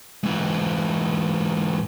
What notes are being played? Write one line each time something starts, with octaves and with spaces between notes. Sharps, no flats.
G#2 E3